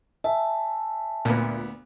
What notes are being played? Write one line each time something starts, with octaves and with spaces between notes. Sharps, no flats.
E5 G#5 A5
D2 A#2 B3